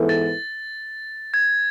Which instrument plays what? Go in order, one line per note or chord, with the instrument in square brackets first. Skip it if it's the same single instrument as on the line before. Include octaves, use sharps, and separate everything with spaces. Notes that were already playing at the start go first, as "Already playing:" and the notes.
Already playing: [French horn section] G#2 E3 B3 E4 A4
[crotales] A6
G#6